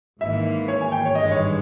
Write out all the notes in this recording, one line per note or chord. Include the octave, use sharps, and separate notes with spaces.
G#1 G#2 E3 A#3 E5
C#5
G#5
G5
C#5
G#1 G2 E3 G#3 D#5
C#5